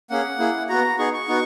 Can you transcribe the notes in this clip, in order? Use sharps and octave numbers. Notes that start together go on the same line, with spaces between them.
A#3 C#4 G#4 F#5
A#3 E4 G#4
B3 F#4 A#5
B3 D#4 G#4 C#6
C#6
B3 D#4 F#4